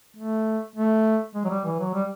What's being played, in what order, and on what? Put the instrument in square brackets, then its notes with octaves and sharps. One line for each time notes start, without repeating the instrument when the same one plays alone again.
[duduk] A3
A3
G#3
F#3
G3
E3
F#3
G3